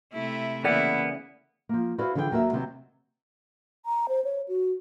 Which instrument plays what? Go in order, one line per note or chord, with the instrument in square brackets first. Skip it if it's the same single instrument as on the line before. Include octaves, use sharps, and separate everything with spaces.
[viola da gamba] C3 A3 E4
[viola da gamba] C#3 E4 [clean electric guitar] E3 A#3 B3 [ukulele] D5 F#5
[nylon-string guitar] F3 A#3
E4 F#4 B4 C5 D5 F5
D3 E3 F3 G#4 D#5 G5
D#2 F#3 A#3 F#4 A#4 E5
C3 D#3 F#3 B3 C4
[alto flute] A#5
C5
C#5
F#4